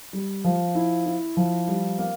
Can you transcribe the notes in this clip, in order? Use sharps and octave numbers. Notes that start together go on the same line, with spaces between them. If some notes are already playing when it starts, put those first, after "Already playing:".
G3
F3
E4
E4
F3
G3
A#3